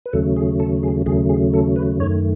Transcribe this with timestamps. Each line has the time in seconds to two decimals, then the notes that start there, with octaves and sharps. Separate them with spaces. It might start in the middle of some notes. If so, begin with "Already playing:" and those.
0.06 B4
0.13 D#2 C#3 F#3 A3 A4
0.37 G#4
0.60 A4
0.83 G#4
1.06 D#2 C#3 F#3 A3 G#4
1.29 G#4
1.53 A4
1.76 B4
2.00 F#2 D#3 A3 C#5